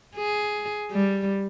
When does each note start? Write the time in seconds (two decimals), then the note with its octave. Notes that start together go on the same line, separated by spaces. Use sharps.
0.17 G#4
0.91 G3